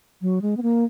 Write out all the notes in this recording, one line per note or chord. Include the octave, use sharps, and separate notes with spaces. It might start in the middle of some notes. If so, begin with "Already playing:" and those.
F#3
G#3
B3
A#3